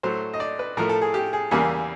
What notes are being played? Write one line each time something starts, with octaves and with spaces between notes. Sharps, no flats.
A2 F#3 A3 C5
D#5
D5
B4
A2 F3 A3 A#4
A4
G#4
G4
G#4
E2 C#3 E3 G3 A#3 G#4